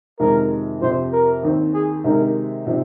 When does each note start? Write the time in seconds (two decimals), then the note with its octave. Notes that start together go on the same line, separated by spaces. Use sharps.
0.19 F2 C3 D#3 G#3 A#4
0.81 F2 C3 F3 C5
1.12 A#4
1.43 D#2 D#3 C4
1.73 G#4
2.04 C3 D#3 G#3 D#4 A#4
2.67 C3 F3 C4 D#4